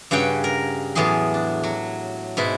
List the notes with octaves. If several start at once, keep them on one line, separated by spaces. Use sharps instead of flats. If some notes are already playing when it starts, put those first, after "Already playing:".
G2 C#3 F#4 C#5 G5
A#4
E2 A2 F#3 G#4 C6
D4
F#3
G#2 B2 E4